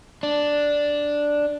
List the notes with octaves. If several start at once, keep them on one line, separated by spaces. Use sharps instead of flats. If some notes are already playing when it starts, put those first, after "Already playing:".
D4